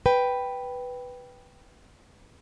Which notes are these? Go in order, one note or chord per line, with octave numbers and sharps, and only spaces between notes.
B4 G5